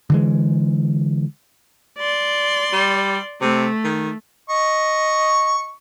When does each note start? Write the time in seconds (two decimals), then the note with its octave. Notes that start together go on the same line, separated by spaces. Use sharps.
0.10 D3 E3 G#3
1.98 D5 C6
2.73 G3
3.41 C3 A3
3.84 D#3
4.50 D#5 C#6